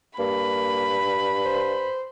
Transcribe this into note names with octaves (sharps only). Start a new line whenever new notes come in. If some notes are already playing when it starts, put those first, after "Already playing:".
G2 A#3 B5
C5